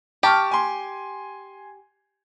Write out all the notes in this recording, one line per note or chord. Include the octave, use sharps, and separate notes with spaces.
G4 A5 C#6 F6
G#5 C6